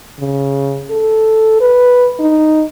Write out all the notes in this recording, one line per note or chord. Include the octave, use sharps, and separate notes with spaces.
C#3
A4
B4
D#4